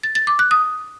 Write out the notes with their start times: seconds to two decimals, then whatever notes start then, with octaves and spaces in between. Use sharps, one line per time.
0.03 A6
0.15 A6
0.27 D6
0.39 F#6
0.51 D#6